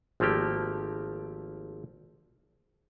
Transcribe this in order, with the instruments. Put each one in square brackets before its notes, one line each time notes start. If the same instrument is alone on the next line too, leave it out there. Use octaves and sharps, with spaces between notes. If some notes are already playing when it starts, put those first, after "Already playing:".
[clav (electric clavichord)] G#1 F3 A3 A#3 G4